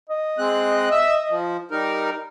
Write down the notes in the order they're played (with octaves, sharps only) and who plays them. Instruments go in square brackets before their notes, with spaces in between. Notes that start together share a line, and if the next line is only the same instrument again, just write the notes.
[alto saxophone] D#5
[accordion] G#3 C4 F#6
E5 E6
F3
G3 D#4 A#4